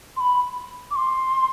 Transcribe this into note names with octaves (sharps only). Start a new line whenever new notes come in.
C6
B5
D6
C6